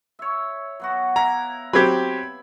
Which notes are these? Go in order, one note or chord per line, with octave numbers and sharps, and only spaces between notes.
C#5 E5
F#3 B3 F#4
E4 F5 A#5 D6
F#3 C4 G4 B5 G#6